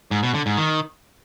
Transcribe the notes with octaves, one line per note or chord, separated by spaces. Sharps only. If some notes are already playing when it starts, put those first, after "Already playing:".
G#2
B2
D3
G#2
D#3